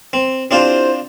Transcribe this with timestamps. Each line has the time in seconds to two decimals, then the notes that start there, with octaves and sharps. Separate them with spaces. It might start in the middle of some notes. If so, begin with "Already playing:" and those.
0.13 C4
0.51 C4 D4 E4 F4 G4 C5